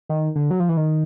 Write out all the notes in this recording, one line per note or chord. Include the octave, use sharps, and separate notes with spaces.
D#3
D3
F#3
F3
E3
D#3